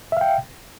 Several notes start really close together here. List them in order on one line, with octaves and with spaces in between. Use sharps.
E5 F5 G5